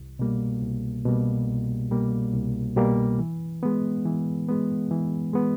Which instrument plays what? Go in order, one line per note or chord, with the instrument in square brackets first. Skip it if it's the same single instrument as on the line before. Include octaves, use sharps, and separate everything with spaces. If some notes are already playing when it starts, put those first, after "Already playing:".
Already playing: [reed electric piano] C2
B2 G3 A#3
C2
B2 G3 A#3
C2
B2 G3 A#3
C2
B2 G3 A#3
E3
G#3 B3
E3
G#3 B3
E3
G#3 B3